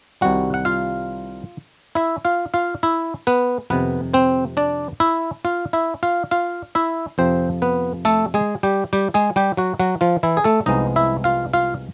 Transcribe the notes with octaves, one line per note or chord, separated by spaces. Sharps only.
C2 C3 D#3 G3 F#4 F#5
F#5
F4 F5
E4 E5
F4 F5
F4 F5
E4 E5
B3 B4
F2 C3 D#3 B3 B4
C4 C5
D4 D5
E4 E5
F4 F5
E4 E5
F4 F5
F4 F5
E4 E5
F2 C3 F3 C4 C5
B3 B4
A3 A4
G#3 G#4
G3 G4
G3 G4
G#3 G#4
G3 G4
F#3 F#4
F#3 F#4
F3 F4
E3 E4
G#4
A3 A4
C2 C3 F3 G#3 B3 D#4 D#5
E4 E5
F4 F5
F4 F5